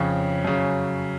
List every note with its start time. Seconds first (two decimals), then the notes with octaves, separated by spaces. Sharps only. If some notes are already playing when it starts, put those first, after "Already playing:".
Already playing: F2 C#3 C#5
0.45 F#2 C#3